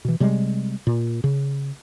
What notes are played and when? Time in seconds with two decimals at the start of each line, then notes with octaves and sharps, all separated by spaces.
0.05 B2 E3
0.20 C3 G3 G#3
0.87 A#2
1.24 C#3